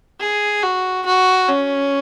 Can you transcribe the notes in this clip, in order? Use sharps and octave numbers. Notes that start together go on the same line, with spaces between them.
G#4
F#4
F#4
C#4